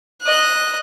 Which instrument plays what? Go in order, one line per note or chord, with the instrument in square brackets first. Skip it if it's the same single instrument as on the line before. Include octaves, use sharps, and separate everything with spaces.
[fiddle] D#5 F#6